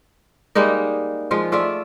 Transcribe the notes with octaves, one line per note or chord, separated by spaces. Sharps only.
G3 G#3 A#3 D#4
F3 G#3 F4
A3 F4 D5 E5